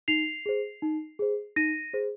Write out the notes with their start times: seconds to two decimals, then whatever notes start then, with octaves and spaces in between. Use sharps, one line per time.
0.08 D#4 C7 F7
0.46 G#4 C5
0.82 D#4
1.19 G#4 C5
1.56 D#4 A#6 D#7
1.93 G#4 C5